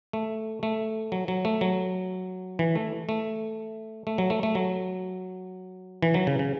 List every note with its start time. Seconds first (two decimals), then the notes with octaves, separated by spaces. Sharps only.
0.13 A3
0.63 A3
1.12 F#3
1.28 F#3
1.45 A3
1.61 F#3
2.59 E3
2.75 A3
3.09 A3
4.07 A3
4.18 F#3
4.30 A3
4.43 A3
4.55 F#3
6.03 E3
6.14 F#3
6.27 C#3
6.39 C#3